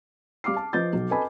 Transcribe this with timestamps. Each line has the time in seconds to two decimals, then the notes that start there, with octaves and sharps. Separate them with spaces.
0.44 G3 F5 D6 F6 C7
0.56 A5
0.73 F3 B4 D#5 G6 A6
0.93 B1
1.10 A4 B4 D#5 G#5 A5 B5